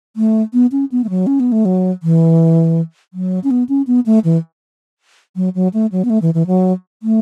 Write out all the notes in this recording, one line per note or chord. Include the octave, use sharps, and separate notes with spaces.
A3
B3
C#4
B3
A3
F#3
C#4
B3
A3
F#3
E3
F#3
C#4
B3
C#4
B3
A3
E3
F#3
F#3
A3
F#3
B3
A3
E3
E3
F#3
A3